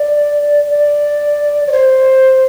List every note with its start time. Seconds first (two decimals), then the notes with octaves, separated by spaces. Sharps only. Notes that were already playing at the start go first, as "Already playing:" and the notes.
Already playing: D5
0.69 D5
1.67 C#5
1.72 C5